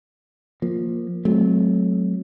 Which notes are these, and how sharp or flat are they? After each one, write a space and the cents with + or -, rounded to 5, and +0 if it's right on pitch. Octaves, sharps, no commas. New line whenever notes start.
F3 +10 A#3 +0
F#3 +0 A3 -30 C4 +0